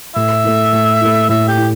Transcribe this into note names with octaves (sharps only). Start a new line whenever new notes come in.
A2 E5
A3 E4
A2
A3 E4
A2 E5
G4
E4